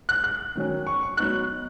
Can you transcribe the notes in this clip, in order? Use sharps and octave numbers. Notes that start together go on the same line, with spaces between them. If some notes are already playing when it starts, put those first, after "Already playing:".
F#6
F#6
D#3 F#3 C#4
C#6
C#6
F#3 B3 D#4 F#6